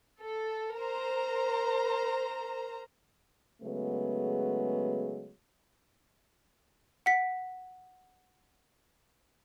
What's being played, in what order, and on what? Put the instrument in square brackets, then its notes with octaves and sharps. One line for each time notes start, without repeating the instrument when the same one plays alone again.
[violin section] A4
A#4 C5 A#5
[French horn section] C#3 F#3 G#3 A3 B3
[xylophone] F#5 B6